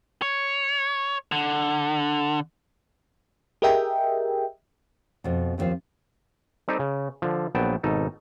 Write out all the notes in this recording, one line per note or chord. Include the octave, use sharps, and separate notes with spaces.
C#5
D3
G4 G#4 A#4 D#5 E5 G5
F2 B2
D#2 D3 F3 C4 F5
G3 C4 D#4 G4 A4
C#3
D3 F3
A#1 F#3 B3 G5 A5
G#1 B2 D#4 A4